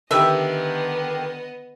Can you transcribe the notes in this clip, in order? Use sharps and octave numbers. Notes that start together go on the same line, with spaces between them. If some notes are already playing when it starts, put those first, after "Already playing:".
D3 D#3 B3 G4 B4 D#5 E5